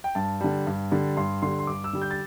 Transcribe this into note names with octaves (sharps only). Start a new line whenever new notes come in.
G5
G2 A5
D3 G3
G2
D3 G3
G2 C6
D3 G3 C6
C6
G2 D6
E6
D3 G3
G6
A6